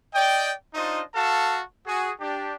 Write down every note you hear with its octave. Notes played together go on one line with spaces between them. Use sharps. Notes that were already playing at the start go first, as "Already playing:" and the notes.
D5 D#5 G5
D4 D#4 F4 C5 D#5
F#4 A4 F5 A5
F#4 G#4
D4 G4